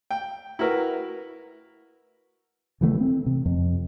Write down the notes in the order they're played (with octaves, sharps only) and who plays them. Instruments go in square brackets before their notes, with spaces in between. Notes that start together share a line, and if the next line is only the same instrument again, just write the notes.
[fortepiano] G5
E4 F#4 A#4 B4
[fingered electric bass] C#3 E3 F#3 A3
C4
C3
F2